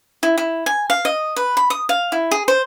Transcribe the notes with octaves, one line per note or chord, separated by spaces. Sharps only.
E4
E4
G#5
F5
D#5
B4
B5
D#6
F5
E4
G#4
C5